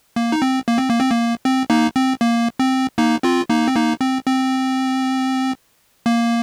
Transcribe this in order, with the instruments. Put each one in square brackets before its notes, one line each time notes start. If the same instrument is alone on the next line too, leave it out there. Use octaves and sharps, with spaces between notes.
[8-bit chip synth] A#3
D#4
C4
A#3
C4
A#3
C4
A#3
C4
A#3 D#4
C4
A#3
C4
A#3 D#4
C4 F4
A#3 D#4
C4
A#3 D#4
C4
C4
A#3